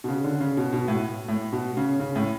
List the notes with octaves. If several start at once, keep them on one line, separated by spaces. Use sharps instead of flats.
B2
C#3
D3
C#3
B2
B2
A2
A2
B2
C#3
C#3
A2